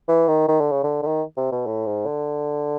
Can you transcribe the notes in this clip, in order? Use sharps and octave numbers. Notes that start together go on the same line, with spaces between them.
E3
D#3
D#3
D3
C#3
D3
D3
D#3
C3
B2
A2
G#2
D3